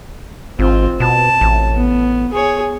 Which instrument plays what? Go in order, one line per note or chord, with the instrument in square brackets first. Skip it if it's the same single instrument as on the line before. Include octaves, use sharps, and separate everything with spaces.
[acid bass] G#1 [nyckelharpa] C4 F4
[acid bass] B2 [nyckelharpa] A5
[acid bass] A1
[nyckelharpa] B3
G#4 C#5